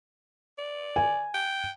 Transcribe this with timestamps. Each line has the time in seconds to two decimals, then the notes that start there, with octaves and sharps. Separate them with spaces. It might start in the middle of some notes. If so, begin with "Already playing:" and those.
0.58 D5
0.96 G#5
1.34 G5